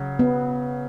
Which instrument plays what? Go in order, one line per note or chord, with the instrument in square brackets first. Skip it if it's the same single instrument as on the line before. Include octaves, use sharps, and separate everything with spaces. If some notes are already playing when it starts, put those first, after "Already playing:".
Already playing: [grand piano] C#3 F#3
[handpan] B3